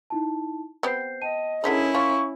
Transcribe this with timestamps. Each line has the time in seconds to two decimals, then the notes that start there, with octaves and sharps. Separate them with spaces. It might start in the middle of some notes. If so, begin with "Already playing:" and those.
0.10 D#4 E4 A5
0.83 B3 C4 G4 C5 G6 C7
1.22 D#5 G5 A5 D#7
1.64 D3 G#3 C#4 D#4 E4 G#4 A#4 B6
1.95 F4 C#6